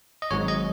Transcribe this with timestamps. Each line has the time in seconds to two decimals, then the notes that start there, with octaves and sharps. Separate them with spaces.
0.22 D#5
0.31 G#1 G#2 F#3 C#5
0.48 D#5